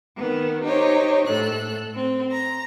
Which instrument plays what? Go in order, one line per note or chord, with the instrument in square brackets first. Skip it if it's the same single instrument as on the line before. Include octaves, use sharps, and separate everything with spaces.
[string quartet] D#3 B3
D#4 G4 C5 C#5
A2 A4 F#6
C4
A#5